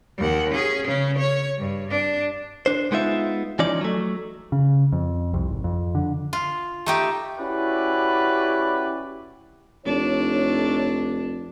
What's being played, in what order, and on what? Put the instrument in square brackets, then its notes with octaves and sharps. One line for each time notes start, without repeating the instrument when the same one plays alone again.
[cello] D#2 F#5
C#4 G#4
C#3 C#4
C#5
G2
D4
[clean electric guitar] D4 C5
G#3 B3 D#4 F4 E5
E3 F3 C#4 D#4 D5
F#3 A3
[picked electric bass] C#3
F2
C2
G#1
F2
D3
[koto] F4
A3 D#4 G4
[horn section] C#4 E4 F#4 G4 B4 D5
[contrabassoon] F1 [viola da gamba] D4 [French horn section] D#4 A4 C#5